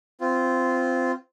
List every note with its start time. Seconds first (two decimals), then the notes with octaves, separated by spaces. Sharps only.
0.21 C4 F4